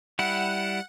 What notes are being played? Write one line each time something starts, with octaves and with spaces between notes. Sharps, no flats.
G3 E4 F#5